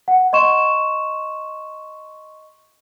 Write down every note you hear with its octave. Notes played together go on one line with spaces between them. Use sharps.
F#5
D#5 C6 C#6 E7